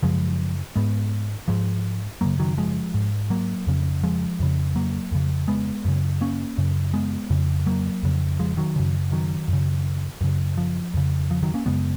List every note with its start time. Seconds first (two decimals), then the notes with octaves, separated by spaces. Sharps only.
0.03 F#2 C#3 F3 G#3
0.76 G#2 G#3 B3
1.48 G#2 F3 G#3
2.21 F#2 C#3 F#3 A#3
2.39 D#3 F#3
2.58 F3 G#3
2.94 G#2
3.30 F#3 A#3
3.67 F2 C#3
4.03 F3 G#3
4.40 F2 C#3
4.76 F#3 A#3
5.12 F2 C#3
5.48 G#3 B3
5.85 F#2 C#3
6.21 A#3 C#4
6.58 F#2 C#3
6.94 G#3 B3
7.30 F2 C#3
7.67 F#3 A#3
8.03 F2 C#3
8.39 F3 G#3
8.57 D#3 F#3
8.76 F#2 C#3
9.12 D#3 F#3
9.48 F#2 C#3
10.21 F#2 C#3
10.57 F3
10.94 F2 C#3
11.31 F3
11.43 D#3 F#3
11.54 A#3 C#4
11.66 F#2 C#3 G#3 B3